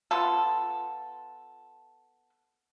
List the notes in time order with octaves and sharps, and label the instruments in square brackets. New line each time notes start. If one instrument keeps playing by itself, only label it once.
[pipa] B3 F4 A4